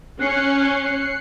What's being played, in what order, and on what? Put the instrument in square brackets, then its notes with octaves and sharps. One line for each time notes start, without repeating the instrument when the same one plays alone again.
[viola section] C#4 [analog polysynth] F#6 C7 C#7